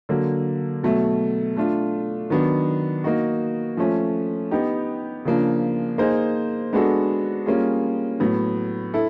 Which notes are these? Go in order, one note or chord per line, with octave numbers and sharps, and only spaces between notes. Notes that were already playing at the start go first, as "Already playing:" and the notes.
D3 F#3 A#3
B2 F#3 A3
A3 D4 F4
D#3 F#3 B3 D4
A#3 D#4 F#4
F3 A3 C#4
B3 D#4 G4
C#3 F3 A#3 D4
A#3 D#4 G#4 C5
G#3 B3 D4 F#4 A4
G3 A#3 C#4 F4 G#4
A2 F#3 B3
E4 A4